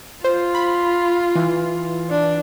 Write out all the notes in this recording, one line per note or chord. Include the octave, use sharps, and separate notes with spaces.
F4 C5
B5
E3
D4